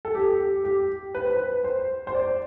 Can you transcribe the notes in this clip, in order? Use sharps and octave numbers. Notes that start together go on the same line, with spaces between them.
A4
G4
G4
G4
B4
C5
B4
C5
C5
D5